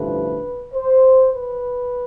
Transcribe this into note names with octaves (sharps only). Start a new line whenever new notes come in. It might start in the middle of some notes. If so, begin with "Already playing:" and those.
Already playing: A1 G2 D3 F3 A3 B4
C5
B4